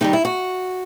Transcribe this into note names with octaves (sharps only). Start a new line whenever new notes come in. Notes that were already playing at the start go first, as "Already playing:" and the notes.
C3 D#3 G3 D#4
E4
F#4